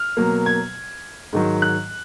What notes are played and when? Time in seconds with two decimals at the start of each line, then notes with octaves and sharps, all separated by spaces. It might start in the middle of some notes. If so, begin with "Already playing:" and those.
Already playing: F6
0.17 B2 F#3 A#3
0.46 G#6
1.33 G#2 D#3 F#3
1.62 F#6